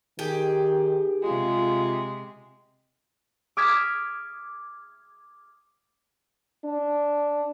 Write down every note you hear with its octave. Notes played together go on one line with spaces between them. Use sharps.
D#3 G4 G#4
C3 G#3 F4
D6 D#6 F6 G#6 B6 E7
D4